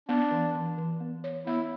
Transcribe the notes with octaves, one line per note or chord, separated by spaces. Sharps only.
B3 D4
E3
E3
E3
B3
C#5
B3 E4